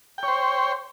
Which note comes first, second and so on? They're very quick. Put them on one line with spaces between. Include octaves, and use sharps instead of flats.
G5 C#5 C5